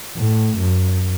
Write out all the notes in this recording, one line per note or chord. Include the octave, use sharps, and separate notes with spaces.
A2
F#2